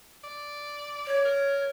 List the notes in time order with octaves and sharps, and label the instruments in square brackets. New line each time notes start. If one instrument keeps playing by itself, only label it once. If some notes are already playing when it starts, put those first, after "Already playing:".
[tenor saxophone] D5
[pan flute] C#5
[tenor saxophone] A#4